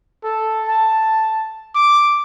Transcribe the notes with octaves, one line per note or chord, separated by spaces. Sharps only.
A4
A5
D6